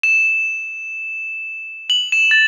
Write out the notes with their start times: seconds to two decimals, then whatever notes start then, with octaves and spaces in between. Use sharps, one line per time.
0.03 E7
1.90 F#7
2.12 E7
2.31 A6